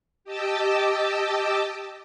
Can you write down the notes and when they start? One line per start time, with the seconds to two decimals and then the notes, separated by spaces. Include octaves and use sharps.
0.24 G4 D#5 A5 D6 E6